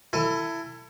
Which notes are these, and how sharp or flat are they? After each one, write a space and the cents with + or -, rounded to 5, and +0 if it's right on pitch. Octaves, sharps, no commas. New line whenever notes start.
E4 +15 A4 +35 G#5 +0